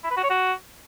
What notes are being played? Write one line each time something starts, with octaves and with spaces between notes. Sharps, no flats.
E4
B4
F#4
C#5
F#4